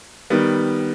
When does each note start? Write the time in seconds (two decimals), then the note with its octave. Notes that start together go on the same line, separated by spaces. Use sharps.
0.30 D#3 G3 B3